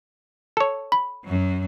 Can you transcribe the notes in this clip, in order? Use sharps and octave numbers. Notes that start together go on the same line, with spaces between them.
A4 C#5
B5
F#2 F#3